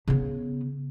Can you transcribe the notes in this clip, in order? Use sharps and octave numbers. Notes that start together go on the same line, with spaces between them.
C#3 B3